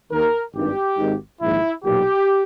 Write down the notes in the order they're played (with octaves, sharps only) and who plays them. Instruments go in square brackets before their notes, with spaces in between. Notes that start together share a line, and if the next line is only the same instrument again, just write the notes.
[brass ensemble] D#2 D#3 A#4
G#1 G2 D#3 G4
G#1 G#2 D#3
A#1 G#2 D#3 E4
B1 A#2 G4